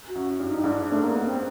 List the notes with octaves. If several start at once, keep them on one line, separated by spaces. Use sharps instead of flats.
F#4
F#2
G2
D#4
G2
G#2 D4
A3
G2 A#3
B3
C4